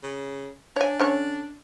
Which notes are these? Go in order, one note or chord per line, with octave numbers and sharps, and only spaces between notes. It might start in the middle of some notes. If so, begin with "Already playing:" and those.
C#3
D4 C#5 G#5
D3 C#4 C#5